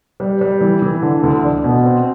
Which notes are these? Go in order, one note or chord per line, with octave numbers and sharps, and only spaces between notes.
G3
G3
E3
E3
D3
D2
D4
B2
C4